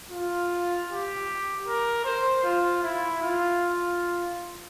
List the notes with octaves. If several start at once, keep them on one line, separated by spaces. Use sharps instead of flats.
F4
G4
A#4
C5
F4
E4
F4